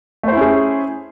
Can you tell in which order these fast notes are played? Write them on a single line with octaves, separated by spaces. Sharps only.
A3 C5 E4 C#4 G#4